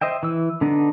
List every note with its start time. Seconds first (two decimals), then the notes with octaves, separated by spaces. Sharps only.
0.01 C5 D#5 E5 G5
0.23 E3 E6
0.61 D3 B3 D4 D#4